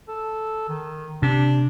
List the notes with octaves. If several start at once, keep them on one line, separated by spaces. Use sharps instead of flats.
A4
D#3
C3 D4